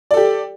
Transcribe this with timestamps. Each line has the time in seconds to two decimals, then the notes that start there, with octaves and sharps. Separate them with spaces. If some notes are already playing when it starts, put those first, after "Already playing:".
0.11 D5
0.14 A4
0.17 G4